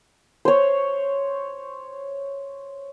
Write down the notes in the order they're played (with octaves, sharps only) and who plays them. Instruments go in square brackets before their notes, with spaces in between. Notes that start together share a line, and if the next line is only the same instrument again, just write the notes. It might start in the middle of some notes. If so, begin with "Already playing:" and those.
[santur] C5 C#5